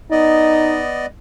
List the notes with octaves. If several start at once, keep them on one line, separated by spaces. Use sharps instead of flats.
B3 D#4 D5 D#5